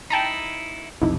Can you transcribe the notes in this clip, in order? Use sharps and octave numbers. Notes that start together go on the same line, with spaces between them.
D#4 E4 G5 A5 A#5
B1 F2 C3 D#4 E4